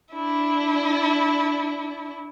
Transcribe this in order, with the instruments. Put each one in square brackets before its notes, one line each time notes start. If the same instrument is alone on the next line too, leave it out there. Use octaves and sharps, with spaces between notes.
[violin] D4 E4